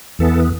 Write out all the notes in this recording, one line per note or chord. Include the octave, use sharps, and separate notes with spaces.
E2 E3 B3 A4